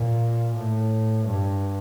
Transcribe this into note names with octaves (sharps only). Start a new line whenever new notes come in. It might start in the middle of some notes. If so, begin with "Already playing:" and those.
Already playing: A#2
A2
G2